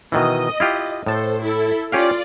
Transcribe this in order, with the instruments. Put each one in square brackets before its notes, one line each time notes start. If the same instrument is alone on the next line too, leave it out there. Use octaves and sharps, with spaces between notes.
[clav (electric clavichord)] B2 D#3 E3 [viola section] D#5
[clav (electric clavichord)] E4 F4 G4
[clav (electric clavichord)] A2 A5 [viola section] A4 C5
[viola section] E4 A4
[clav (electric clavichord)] C#4 G4 F5 [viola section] F4 D5